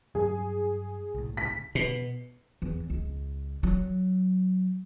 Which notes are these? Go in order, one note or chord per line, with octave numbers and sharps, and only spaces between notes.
G2 F#3 G#4
C2 A2
C#2 A2 B6
B2
E2
C#2
F#3